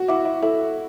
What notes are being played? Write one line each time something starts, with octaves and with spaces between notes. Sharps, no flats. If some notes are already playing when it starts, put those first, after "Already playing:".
Already playing: F#4
E4 F#5 D6
E4
E4 A4